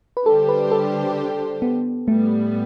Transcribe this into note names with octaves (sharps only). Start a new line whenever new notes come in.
B4
D3 G3 D4 G4 A4 C5
B4
A4
B3
A2 G3 A3 B3